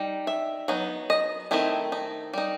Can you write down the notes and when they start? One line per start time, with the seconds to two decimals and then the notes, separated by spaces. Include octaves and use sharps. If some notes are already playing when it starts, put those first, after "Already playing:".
Already playing: G3 D#4
0.27 E5
0.68 F#3 B3 D#4
1.10 D#5
1.51 D#3 A3 C4 D#4 E4
1.92 D#4
2.33 G3 D#4